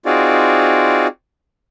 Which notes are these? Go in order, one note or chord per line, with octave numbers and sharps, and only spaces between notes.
C4 D#4 F4 F#4 G#4 D5